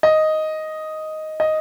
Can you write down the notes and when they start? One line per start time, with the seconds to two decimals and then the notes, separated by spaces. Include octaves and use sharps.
0.03 D#5
1.40 D#5